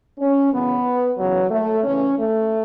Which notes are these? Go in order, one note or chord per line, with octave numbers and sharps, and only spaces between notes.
C#4
F#2 C#3 E3 B3
E2 C#3 E3 F#3
A3
E2 C#3 E3 C#4
A3